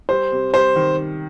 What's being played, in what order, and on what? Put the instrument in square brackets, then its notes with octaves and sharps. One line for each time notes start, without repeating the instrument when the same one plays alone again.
[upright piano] G3 [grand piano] C5
[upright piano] C3
[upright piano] G3 [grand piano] C5
[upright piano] D#3